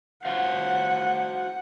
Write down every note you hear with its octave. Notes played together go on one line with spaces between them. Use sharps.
F#4 C5 F5 F#5